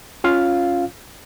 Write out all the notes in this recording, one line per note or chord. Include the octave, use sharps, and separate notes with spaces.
C#4 F4 F5